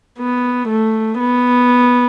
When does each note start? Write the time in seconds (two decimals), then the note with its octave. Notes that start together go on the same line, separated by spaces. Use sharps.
0.18 B3
0.68 A3
1.19 B3